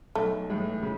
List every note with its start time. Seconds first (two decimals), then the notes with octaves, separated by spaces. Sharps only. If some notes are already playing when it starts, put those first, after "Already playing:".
0.15 B1 A3
0.49 A2 E3 G#3
0.82 C#3